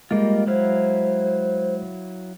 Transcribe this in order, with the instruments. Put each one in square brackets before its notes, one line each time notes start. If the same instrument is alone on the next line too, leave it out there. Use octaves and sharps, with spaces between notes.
[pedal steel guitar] G3 A#3 F4 [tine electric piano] G#3 [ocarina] D#5
[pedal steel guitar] F#3 E4 F5 [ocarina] C5